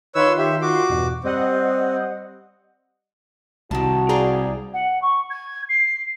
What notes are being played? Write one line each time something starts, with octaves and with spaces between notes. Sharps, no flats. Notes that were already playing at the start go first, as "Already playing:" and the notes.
D#3 F4 B4 C#5 C6 E6
G4 E5
F#4 D6
E2 G2 B2
G3 C4 D#5 F#5
C2 D#3 F#4 A5
G#4 D5 F5 G5 A#5
F#5
C#6
G#6
C7